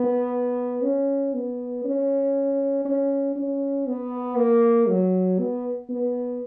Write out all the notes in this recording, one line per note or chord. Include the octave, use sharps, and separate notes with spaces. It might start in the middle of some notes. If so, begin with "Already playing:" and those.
Already playing: B3
C#4
B3
C#4
C#4
C#4
B3
A#3
F#3
B3
B3